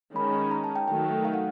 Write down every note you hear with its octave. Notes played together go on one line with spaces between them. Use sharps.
D#3 G#3 C#4 B5
A#5
A5
G5
D#3 F#3 A3 G5
F5
F#5